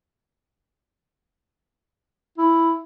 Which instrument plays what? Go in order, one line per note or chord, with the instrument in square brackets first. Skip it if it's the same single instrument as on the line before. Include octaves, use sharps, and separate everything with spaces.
[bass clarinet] E4